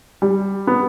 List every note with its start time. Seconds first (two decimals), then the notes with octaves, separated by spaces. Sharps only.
0.22 G3
0.67 B3